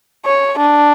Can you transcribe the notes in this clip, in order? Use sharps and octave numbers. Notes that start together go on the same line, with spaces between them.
C#5
D4